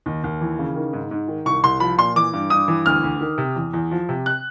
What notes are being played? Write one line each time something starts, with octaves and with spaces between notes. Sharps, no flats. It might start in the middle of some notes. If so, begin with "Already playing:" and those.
D#2
D#2
E3
C#3
D#3
G#2
G#2
D#3
C2 C#6
C2 C6
F3 B5
A#2 C6
E3 D6
G2
G2 D#6
E3
D2 F6
D2
D#3
C3
E2
E2
F3
C3
F#6